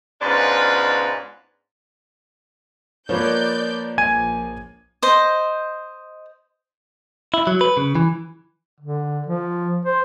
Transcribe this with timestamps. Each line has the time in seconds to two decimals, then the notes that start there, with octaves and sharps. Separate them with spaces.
0.22 G#2 B2 C#4 D4 F4 B4
3.09 F3 A#3 A#4 B4 C#5 D5 G6
3.98 A#1 G#5 G#6 D#7
5.03 C5 D#5
7.34 E4
7.47 F#3
7.61 B4
7.77 C#3
7.95 E3
8.80 D3
9.26 F3
9.85 C5